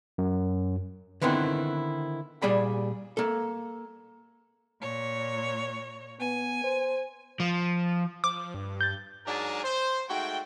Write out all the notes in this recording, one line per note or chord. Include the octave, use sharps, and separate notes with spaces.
F#2
D3 D#3 B3 C4 E4
A#2 G3 G#4 D5 B5
A#3 A4
A#2 C#5
B3 G#5
C5
F3
F3 D6
G2
G6 A6
G#2 F#3 D4 G#4 A#4 A5
C5
G#2 A3 F#4 G5